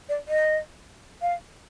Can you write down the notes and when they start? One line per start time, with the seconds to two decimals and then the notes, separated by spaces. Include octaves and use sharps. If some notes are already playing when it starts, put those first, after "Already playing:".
0.09 D5
0.28 D#5
1.22 F5